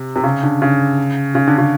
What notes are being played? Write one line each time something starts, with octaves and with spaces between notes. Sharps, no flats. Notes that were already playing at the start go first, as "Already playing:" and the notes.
Already playing: C3
C3
C#3
D3
C#3
C#3
D3
C#3